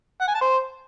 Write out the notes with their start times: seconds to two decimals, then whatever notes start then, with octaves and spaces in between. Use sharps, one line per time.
0.21 F#5
0.28 G#5
0.35 A5
0.42 C5